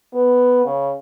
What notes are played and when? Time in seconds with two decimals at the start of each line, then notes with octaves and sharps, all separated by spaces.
0.14 B3
0.65 C#3